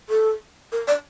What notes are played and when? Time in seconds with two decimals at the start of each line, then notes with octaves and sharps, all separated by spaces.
0.09 A4
0.72 A#4
0.88 D5